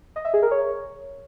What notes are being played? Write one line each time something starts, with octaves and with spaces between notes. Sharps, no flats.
D#5
E5
G#4
A#4
C#5